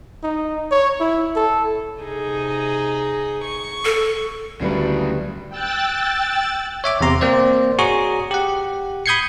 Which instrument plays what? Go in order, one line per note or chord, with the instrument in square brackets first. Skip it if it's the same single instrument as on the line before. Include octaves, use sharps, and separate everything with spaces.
[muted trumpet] D#4
C#5
E4
A4
[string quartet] C3 D#4 G#4
C#6
[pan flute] A4
[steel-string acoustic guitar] D2 G3 B4 [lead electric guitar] C#3 F#3
[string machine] G5 E6 F#6 A6
[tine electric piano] C#5 E5 D6
E2 C3 A#5 C6
A#3 C4 C5 D5
F#4 G#4 C#5 A#5 C#6 D#6
G4 F#5
B5 D#6 G6 G#6 C7 C#7